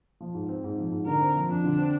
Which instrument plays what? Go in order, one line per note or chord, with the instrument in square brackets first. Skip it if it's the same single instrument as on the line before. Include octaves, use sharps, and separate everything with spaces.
[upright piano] F3
G#2
C4
G#2
F3
G#2
[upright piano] D3 [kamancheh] A#4
[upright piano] C4
F3
[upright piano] F2 [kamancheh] D4
[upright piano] D3
C4